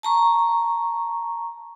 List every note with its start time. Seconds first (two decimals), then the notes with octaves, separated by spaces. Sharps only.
0.03 A5 A#5 C#6